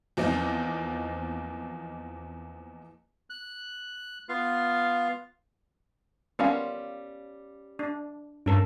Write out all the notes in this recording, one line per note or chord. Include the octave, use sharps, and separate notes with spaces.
E2 F3 A#3 C4 D#4
F#6
B3 F4 F5
G3 B3 C#4 F4 A#4 F5
D4
G2 C#4 A4 A#4